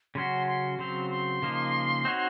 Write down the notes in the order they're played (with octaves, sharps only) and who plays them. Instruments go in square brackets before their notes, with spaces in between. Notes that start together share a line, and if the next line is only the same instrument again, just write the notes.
[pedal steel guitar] C#3 F#3 C#4 F#4 [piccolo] C6
[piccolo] C6
[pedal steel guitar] C#3 F#3 C4 [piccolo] C6
[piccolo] C6
[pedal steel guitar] C#3 F3 A#3 D#4
C4 D#4 F#4 C#5